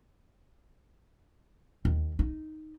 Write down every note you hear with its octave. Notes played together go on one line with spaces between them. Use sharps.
D#2
D#4